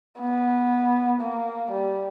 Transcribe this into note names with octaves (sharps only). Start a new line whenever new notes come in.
B3
A#3
G3